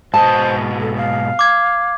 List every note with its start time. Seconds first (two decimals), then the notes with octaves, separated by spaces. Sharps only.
0.14 G#2 B2 C5 D#5 A5
0.80 A4
0.96 F5
1.39 D6 G#6